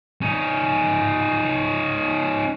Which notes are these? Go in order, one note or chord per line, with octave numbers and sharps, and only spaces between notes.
C#4 D#4